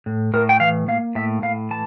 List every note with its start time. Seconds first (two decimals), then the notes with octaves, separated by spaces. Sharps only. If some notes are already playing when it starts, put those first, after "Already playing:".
0.06 A2
0.34 A2 A#4
0.49 G5
0.60 E3 F5
0.88 A#3 F5
1.15 A2 E5
1.42 A2 F5
1.70 E3 A5